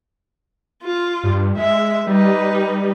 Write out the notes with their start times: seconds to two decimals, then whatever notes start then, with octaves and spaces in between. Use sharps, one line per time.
0.83 F4
1.24 G2
1.57 G#3 E5
2.07 G3 D#4 B4